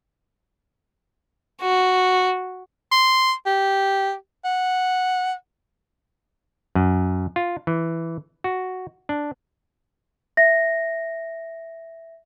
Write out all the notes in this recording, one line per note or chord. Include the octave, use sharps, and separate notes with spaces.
F#4
C6
G4
F#5
F#2
F4
E3
F#4
D4
E5 A#6